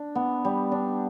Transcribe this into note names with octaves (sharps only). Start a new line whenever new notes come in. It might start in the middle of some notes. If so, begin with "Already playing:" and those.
Already playing: D4
B3
G3
D4